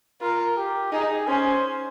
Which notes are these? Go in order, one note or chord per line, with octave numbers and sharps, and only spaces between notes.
F4 A#4
G4
D#4 G#4
C#4 C5